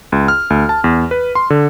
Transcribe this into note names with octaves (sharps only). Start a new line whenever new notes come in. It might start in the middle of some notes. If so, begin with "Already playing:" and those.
C#2
F6
D2
A5
E2
B4
C6
D3